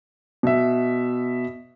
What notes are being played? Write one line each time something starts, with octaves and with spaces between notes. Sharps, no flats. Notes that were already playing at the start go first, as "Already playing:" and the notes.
B2 E5